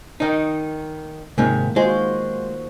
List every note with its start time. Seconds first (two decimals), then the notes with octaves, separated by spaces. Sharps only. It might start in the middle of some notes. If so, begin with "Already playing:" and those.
0.20 D#3 D#4
1.38 G#2 C3 D#3 A#3 F4
1.76 G#3 F4 F#4 C5